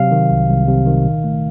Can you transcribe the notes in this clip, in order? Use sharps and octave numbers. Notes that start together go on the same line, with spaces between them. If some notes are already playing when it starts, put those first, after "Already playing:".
Already playing: C3 F#3 F5
D#3
C2
C2
C3
D#3
A#2
A3